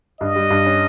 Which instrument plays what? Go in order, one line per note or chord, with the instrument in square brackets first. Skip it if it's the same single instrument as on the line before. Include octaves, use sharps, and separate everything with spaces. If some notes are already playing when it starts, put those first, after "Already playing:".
[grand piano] G2 [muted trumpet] D#5
[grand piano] G3
G2
C#4